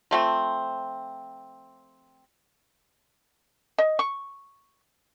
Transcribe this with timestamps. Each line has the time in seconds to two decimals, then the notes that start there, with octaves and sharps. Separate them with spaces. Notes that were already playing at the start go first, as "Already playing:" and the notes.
0.11 F3 A3 C4
3.78 D#5
3.99 C#6